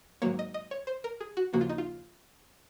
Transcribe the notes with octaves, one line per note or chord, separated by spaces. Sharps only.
G#2 D#3 F#3 A#3 C#5
D#5
D#5
C#5
C5
A#4
G#4
F#4
D#2 C#3 F3 A#3 F#4
F4
D#4
F4